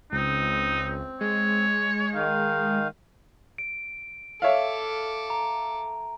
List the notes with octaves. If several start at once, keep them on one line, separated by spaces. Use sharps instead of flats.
C#2 C4 D#4
G#3 C#5
D#3 D#4 F5
D7
A4 C#5 E5 F5 D6
A#5